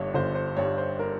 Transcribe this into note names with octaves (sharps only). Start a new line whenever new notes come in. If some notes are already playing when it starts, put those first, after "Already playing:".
Already playing: G1 G2 G3 C#5
G1 C5
C5
G2 G3 C#5
C5
A#4